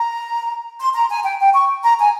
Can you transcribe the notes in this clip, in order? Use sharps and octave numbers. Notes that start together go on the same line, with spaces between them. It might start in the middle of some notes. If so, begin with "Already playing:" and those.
Already playing: A#5
C6
A#5
G#5
G5
G5
C#6
A#5
G#5